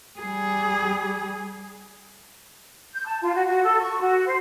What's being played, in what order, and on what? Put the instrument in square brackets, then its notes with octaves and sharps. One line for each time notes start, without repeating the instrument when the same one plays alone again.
[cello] G3 G#4
[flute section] G6
A5
F4
F#4
F#4
A4
C#6
F#4
C5